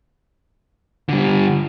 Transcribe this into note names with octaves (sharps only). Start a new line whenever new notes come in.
D3 G3